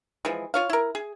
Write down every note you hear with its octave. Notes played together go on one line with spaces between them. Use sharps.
E3 F3 G#3
F4 C#5 F5
E4 A#4
G#4